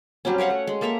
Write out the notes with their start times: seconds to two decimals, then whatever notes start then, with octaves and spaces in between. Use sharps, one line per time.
0.25 F#3 G3 C4 C#4
0.38 G4 C#5 F5 F#5
0.50 A3
0.67 G#3
0.81 A#3 A4 E5 A#5